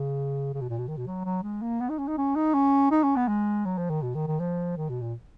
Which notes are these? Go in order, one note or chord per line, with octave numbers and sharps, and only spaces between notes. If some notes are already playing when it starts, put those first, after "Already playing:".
Already playing: C#3
C#3
B2
A#2
B2
D#3
B2
F#3
F#3
G#3
A#3
B3
D#4
C#4
D#4
C#4
D#4
C#4
D#4
C#4
B3
G#3
F#3
F3
D#3
B2
D#3
D#3
F3
D#3
B2
A#2